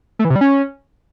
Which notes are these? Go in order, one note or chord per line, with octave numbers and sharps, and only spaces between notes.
A3
E3
C3
G3
C#4